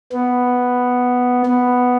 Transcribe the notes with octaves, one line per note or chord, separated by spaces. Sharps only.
B3
B3